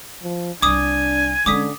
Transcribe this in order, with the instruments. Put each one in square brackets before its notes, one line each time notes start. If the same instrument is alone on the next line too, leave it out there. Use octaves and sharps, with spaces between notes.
[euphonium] F3
[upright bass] C2 G3 [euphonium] D4 [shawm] G#5 [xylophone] D6 D#6
[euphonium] D3 [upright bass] G#3 C#4 [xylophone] D6 D#6 B6